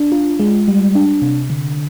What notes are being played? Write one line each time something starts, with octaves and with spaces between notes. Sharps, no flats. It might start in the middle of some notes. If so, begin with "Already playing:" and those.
Already playing: D4
F4
G#3
G3
D4
C3
D3